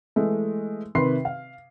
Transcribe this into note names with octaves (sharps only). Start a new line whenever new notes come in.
E3 G#3 A3
C3 D#3 B4 C6 C7
F5